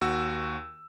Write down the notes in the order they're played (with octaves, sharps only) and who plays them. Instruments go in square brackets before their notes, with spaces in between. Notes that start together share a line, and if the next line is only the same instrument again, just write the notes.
[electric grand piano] D#2 F#4 E6